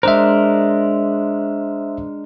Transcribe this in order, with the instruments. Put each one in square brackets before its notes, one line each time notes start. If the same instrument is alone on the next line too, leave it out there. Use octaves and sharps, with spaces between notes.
[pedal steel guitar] G#3 D4 A#4 [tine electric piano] C5 E5